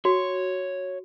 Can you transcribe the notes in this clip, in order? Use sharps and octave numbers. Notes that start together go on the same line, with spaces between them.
F#4 C#5